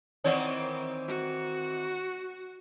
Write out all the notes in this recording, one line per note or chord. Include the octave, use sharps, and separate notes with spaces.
D#3 E3 C4 C#5 D5 F#5
F#4